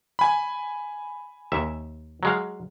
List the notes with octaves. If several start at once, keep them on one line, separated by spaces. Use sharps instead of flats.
G#5 B5
D#2 E5
F#3 G#3 F5